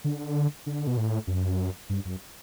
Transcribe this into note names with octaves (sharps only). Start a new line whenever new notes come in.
D3
D3
B2
A2
F#2
G2
F#2